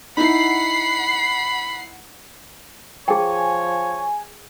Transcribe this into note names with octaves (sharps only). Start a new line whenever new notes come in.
D#4 E4 F#5 B5 C7
F3 G#4 C#5 G5 G#5